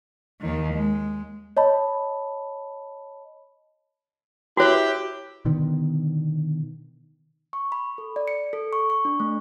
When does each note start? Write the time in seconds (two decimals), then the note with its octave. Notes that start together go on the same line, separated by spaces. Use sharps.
0.41 D#2 D#3
0.73 G#3
1.57 C#5 D#5 A5 B5
4.57 E4 F#4 G4 C#5
5.45 B2 D3 D#3 B3
7.53 C#6
7.72 B5
7.98 A4
8.16 D5
8.28 C#7
8.53 A4
8.73 C#6
8.90 C#6
9.05 D4
9.20 A3